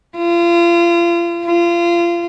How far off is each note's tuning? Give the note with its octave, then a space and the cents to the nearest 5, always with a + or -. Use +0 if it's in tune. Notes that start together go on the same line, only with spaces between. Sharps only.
F4 -35
F4 -30